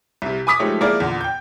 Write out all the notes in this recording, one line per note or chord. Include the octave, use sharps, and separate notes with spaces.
C2 C3
G#5 B5 D6 D#6 B6
F3 G#3 A3 D#4 G4 C#5
F3 A#3 E4 G#4 A#4 D5
E2 A#2 D3
G5 G6